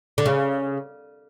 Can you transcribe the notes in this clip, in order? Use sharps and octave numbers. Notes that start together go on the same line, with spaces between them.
D3
C#3